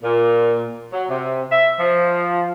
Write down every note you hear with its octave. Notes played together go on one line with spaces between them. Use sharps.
A#2
F#3
C3
E5
F3